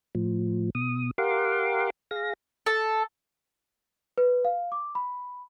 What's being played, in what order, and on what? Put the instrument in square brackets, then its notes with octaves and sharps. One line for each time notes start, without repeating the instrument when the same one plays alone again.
[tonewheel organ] A2 F3
B2 D#6
G4 A#4 F5 F#5 C6 D6
G#4 F5 A#6
[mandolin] A4
[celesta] B4
F5
D6
B5